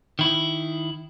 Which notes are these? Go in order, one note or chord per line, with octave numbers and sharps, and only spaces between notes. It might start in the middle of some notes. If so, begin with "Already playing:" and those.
D#3 E4